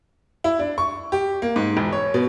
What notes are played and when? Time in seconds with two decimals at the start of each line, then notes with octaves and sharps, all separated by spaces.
0.44 E4
0.59 D4
0.78 C#6
1.12 G4
1.42 A#3
1.56 G#2
1.77 E1
1.93 C#5
2.14 B2